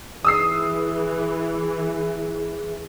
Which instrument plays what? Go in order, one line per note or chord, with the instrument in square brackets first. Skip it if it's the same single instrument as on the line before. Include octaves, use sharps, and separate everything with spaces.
[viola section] E3 [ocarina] G#4 [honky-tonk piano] D#6 E6 C7